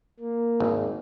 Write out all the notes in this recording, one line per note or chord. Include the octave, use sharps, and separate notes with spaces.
A#3
G#1